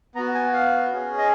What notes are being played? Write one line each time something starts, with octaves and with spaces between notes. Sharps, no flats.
B3 F#4 A#5
G#5
F5
C#4 G#4
D#5